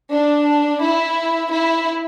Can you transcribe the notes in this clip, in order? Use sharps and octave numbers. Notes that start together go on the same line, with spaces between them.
D4
E4
E4